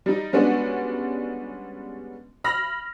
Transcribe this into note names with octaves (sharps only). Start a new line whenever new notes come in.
G3 D#4
G3 G#3 B3 C#4 D4 F#4
B5 F6 A#6